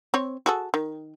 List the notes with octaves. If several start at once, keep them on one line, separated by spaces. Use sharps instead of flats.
C4 C#5
F#4 G#4 A4
D#3